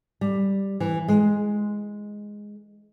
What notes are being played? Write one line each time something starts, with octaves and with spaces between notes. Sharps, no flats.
G3
E3
G#3